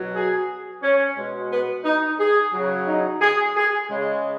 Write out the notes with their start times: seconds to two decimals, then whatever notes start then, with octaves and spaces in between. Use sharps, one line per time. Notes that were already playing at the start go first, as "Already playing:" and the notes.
Already playing: B2 F#3
0.15 G#4
0.83 C#4
1.16 B2 G#3
1.51 B3
1.84 D#4
2.19 G#4
2.54 C#3 F#3
2.87 D#4
3.21 G#4
3.56 G#4
3.89 C#3 G#3